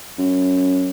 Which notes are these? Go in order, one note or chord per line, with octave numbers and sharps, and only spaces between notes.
F#2